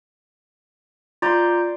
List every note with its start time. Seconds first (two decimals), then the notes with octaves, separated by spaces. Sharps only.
1.22 F4 D5 A#5 C6 G6